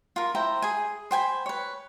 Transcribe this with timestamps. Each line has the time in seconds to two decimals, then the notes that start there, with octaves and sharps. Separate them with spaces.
0.16 F4 A#4
0.35 E4 C5 G5 A#5
0.62 G#4 G#5
1.11 C5 G5 G#5 B5
1.46 B4 C#5